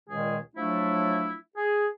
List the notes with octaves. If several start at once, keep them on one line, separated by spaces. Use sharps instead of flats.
C#2 A#2 D#3 G#3 G#4
F3 F#3 A3 D4 E4
G#4